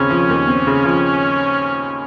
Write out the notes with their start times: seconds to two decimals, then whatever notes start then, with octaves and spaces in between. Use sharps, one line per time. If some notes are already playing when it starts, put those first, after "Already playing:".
Already playing: D#2 C#3 C4 C#4
0.10 F3
0.29 D#2
0.48 C4
0.67 C#3
0.85 F3